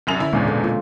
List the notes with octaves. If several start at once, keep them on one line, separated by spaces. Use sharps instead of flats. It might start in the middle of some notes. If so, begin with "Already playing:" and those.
C2 F#2 F7
D3 C#4 E4
G#1 E2 B2 G#3 D4
A#2 A4
F4